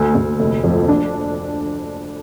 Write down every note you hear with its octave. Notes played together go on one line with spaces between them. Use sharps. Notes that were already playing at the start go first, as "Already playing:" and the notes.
Already playing: D2
D2
F1
F2
D4